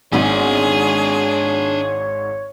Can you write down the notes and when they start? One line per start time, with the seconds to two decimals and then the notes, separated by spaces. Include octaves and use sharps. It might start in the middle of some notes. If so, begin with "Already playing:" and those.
0.12 G#1 G#2 D4 G#4 C#5 G#5